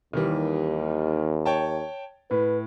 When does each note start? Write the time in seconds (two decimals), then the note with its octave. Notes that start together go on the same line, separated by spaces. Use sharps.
0.13 D#2 D#3 E3 G3
1.46 C#5 G5 A5
2.31 A2 B4